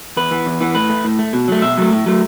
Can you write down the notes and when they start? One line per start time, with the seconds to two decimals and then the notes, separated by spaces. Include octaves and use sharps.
0.17 E2 B4
0.31 E3 B3
0.46 E2
0.61 E3 B3
0.75 A2 B4
0.89 A3
1.04 A2
1.19 A3
1.33 B2
1.48 F#3 A3
1.62 B2 E5
1.78 F#3 A3
1.92 A2
2.06 F#3 A3